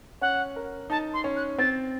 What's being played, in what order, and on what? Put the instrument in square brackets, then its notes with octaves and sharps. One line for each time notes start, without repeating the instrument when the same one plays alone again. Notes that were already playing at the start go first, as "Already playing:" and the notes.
[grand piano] C#4 [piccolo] F#5
[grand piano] A#4
[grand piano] D#4 [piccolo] A5
[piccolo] C6
[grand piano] C#4
[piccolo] F#6
[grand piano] C4 [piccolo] A6